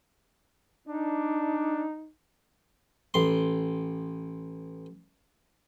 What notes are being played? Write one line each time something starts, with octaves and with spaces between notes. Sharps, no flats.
D4 D#4
A1 C6